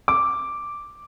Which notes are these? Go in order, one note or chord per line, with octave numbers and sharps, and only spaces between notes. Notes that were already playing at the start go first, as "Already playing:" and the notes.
D6